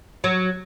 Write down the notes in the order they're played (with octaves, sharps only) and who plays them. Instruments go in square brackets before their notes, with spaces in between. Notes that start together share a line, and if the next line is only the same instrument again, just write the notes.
[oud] F#3